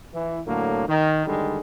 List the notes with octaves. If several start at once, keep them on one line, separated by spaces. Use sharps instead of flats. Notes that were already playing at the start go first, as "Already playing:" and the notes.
E3
A2 D3 F#3 A#3
D#3
D3 D#3 G3 G#3